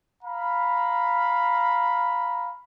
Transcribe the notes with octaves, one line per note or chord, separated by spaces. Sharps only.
F5 A#5 B5